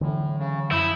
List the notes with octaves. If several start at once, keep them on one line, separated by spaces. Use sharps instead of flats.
A2 D3 E3 F#3
C#3
F#2 F3 E4 D#6 E6 G6